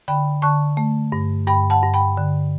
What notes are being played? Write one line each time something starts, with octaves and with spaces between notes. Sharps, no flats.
D3 G5 B5
D3 A5 C#6
A3
G2
G2 G5 B5
F#5 A5
G2
G5 B5
D3